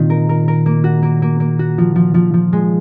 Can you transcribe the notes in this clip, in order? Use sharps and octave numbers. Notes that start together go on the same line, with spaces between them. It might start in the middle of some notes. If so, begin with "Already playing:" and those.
Already playing: A#2 D#3 C4 F4
A#4
A#4
A#4
A#3
F#4
A#3
A#3
A#3
F#4
F3
F3
F3
F3
G#3